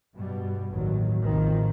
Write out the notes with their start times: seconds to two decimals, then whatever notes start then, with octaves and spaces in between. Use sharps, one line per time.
0.15 G2 B2 G3
0.72 A1 D#2 D#3 F#3
1.23 A1 C3 D#3 F3